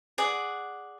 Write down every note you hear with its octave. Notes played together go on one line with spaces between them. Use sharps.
G#4 D5 F#5